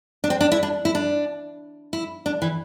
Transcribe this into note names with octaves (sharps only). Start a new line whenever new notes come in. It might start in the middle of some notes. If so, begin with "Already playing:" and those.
D4
C4
D4
E4
D4
E4
D4
E4
D4
E3